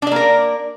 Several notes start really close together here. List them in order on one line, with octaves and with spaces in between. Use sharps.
D4 D5 A#3 A#4